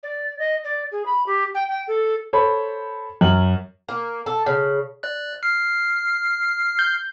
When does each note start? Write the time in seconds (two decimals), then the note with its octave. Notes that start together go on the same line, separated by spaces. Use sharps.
0.03 D5
0.39 D#5
0.64 D5
0.92 G#4
1.06 B5
1.26 G4
1.54 G5
1.68 G5
1.88 A4
2.33 A4 C5 C#5 B5
3.21 F#2 F#7
3.89 A#3
4.26 A4
4.46 C#3
5.03 D5 F#6
5.43 F6 C7
6.79 G6